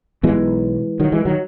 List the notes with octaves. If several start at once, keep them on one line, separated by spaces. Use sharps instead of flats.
B1 B2 E3 G#3
D#3 F#3
E3 G#3
D#3 F#3